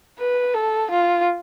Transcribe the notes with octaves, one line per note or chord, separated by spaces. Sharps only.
B4
A4
F4